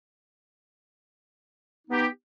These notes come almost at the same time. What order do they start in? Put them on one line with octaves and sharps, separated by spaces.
D#4 B3 G4